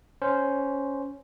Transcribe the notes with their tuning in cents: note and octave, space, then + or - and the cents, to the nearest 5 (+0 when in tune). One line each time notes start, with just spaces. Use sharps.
C#4 +5 C5 -5